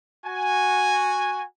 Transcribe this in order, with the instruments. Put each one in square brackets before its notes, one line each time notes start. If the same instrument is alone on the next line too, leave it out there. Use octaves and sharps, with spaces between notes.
[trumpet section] F#4 G#5